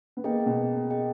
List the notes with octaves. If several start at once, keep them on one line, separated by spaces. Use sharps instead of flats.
B3
A#3 G#4 D#5 G5
B2
G#4 D#5 G5